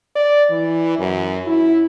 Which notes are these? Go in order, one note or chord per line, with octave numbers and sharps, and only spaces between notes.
D5
E3
F#2
E4